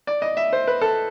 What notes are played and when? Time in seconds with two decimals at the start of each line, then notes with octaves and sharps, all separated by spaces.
0.07 D5
0.22 D#5
0.37 E5
0.53 C5
0.67 B4
0.81 A4